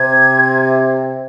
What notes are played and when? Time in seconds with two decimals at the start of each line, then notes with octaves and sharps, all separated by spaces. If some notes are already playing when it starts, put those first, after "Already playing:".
Already playing: C3 G#6